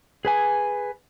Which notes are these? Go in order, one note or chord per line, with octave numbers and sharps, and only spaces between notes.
G#4 B4 G#5